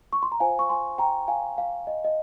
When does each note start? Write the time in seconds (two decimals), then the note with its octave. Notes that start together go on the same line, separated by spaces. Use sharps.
0.13 C#6
0.23 C6
0.32 A#5
0.40 F4 C5 F5 G#5
0.59 C#6
0.69 G#5 C6
0.98 G5 A#5
1.28 F5 G#5
1.58 F5
1.87 D#5
2.04 D#5